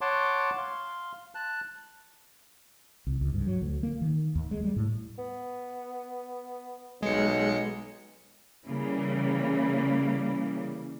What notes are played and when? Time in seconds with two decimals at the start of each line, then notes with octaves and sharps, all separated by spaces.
0.01 C#5 F#5 A5 C6 D6
0.58 F5 C6
1.35 A5 F#6
3.07 C2
3.21 C#2
3.34 G2
3.47 F#3
3.62 D2
3.83 A#3
4.01 D#3
4.35 D#2
4.51 G#3
4.64 G3
4.76 A2
5.18 B3
7.03 B1 G#3 C#7
8.66 C#3 E3 G3 A#3